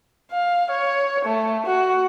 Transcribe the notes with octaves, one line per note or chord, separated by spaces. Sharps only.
F5
C#5
A3
F#4